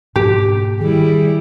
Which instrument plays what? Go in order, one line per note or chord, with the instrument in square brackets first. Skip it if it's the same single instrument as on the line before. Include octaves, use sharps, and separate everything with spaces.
[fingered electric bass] G#2 B2 A#3 [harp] G4
[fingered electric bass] D#3 [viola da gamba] G3 E4 [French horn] G#4